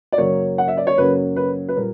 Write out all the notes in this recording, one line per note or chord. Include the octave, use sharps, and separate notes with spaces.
D5
F#2 C#3 F#3 A#3 C#5
F#5
E5
D5
C#5
F#2 C#3 F#3 A#3 B4
B4
B4
A#2 G3 A#4